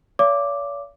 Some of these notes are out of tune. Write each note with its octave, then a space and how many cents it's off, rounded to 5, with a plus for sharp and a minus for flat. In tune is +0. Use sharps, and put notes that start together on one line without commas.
C#5 +45 F5 -45 D6 +0